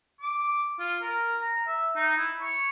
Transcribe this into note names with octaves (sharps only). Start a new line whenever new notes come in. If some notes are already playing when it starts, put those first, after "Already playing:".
D6
F4
A#4
A#5
E5
D#4
E4
C#5